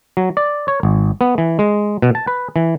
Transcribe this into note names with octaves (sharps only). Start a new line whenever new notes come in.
F#3
D5
C#5
G#1
B3
E3
G#3
B2
A5
B4
E3